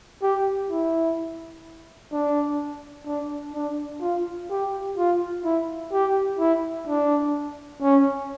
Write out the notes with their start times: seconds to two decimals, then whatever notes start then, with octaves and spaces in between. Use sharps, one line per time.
0.22 G4
0.70 E4
2.12 D4
3.06 D4
3.54 D4
4.01 F4
4.50 G4
4.97 F4
5.44 E4
5.93 G4
6.39 E4
6.87 D4
7.82 C#4